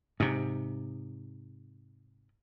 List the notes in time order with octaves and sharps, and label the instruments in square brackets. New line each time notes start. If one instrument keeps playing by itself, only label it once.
[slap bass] G#2 C3